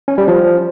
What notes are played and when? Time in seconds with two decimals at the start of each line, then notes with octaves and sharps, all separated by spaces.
0.08 C#4
0.18 G3
0.28 F3